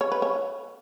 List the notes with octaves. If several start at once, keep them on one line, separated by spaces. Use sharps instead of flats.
C#5
B4
C#5